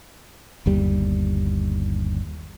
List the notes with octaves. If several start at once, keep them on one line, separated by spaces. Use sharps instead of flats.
G1 D#2 G3